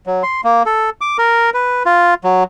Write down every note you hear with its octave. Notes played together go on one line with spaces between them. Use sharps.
F#3
C6
A#3
A4
D6
A#4
B4
F4
F#3